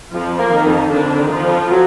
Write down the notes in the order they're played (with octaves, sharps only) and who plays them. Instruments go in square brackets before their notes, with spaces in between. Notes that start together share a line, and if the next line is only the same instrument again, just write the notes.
[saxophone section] F2 [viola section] F3 F4
[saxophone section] A#3
[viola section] D#3 D#4
[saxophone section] F2
[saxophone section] F2 [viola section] D3 D4
[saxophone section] D#3
[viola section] F3 F4
[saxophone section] F2
F#3